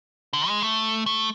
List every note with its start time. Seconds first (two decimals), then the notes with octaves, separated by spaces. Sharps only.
0.33 D3
0.48 G#3
0.62 A3
1.06 A3